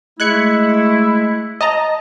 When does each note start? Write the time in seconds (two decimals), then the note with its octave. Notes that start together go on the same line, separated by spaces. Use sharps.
0.20 G#3 A3 E4 F#6 G#6 C#7
1.61 D#5 A5 A#5